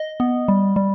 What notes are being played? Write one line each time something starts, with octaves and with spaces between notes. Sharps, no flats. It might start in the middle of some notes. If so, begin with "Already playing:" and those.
Already playing: D#5
B3
G3
G3